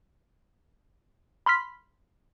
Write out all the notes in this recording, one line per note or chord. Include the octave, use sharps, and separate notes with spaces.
B5 C6 F6 B6